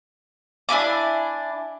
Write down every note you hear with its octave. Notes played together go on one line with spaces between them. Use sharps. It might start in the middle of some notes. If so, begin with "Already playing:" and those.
D4 E4 G#5 D6